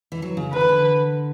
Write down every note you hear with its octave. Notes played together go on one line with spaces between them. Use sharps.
E3
F#3
C#3
D3 B4
E3
D3